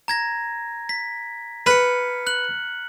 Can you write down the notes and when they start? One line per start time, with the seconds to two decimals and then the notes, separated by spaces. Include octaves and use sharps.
0.08 A#5 G#6 A#6
0.89 B6
1.66 B4 F6 C#7
2.27 F#6 F#7